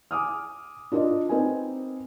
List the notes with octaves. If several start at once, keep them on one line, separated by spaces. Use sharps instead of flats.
G#5 D6 D#6 F6
D4 F4 A#4 D5 D#5
C4 D#4 A#4 B4 D#5 G#5